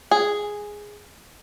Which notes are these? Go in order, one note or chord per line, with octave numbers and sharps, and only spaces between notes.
G#4